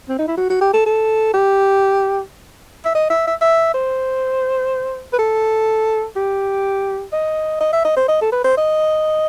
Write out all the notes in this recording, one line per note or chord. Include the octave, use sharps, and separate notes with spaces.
C4
D#4
E4
F#4
F#4
G4
A4
A4
G4
E5
D#5
E5
E5
E5
C5
B4
A4
G4
D#5
D#5
E5
D#5
C5
D#5
A4
B4
C5
D#5